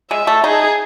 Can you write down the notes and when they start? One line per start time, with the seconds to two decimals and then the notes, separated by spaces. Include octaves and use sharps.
0.11 G#3 E5
0.27 A3
0.44 D#4 G#4